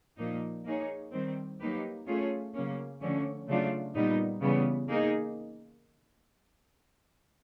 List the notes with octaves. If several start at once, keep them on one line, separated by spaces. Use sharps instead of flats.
A#2 F3 A#3 D#4
A#3 D#4 G#4 C#5
D#3 G3 C4
F#3 A#3 D#4 G4 B4
A3 C#4 F4 G#4 C#5
C#3 F#3 A#3 C#4
D3 F3 A3 C#4
C#3 F#3 A3 D4 F4
A#2 G3 B3 D#4
C#3 E3 G3 B3
A#3 D#4 G#4